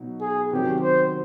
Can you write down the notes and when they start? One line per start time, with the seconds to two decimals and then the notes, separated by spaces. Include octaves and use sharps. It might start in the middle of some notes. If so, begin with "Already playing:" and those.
Already playing: B2 F#3 B3 D#4
0.21 G#4
0.51 C3 D#3 F#3 G4
0.80 C5